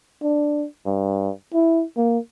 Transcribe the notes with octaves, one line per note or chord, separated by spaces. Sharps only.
D4
G2
E4
A#3